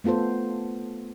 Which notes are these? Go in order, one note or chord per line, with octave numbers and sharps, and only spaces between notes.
A3 B3 F4 A4 C5